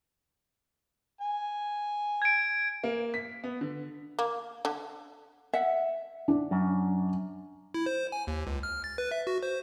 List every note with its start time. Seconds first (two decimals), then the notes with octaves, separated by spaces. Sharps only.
1.21 G#5
2.22 G#6 D7
2.84 A#3
3.14 B6
3.44 B3
3.61 D3
4.19 A#3
4.65 D3
5.53 E5 F#5
6.28 D4
6.51 F#2
7.74 E4
7.86 C5
8.12 G#5
8.27 D#2
8.47 C#2
8.63 F6
8.84 A6
8.98 B4
9.11 E5
9.27 F#4
9.43 C5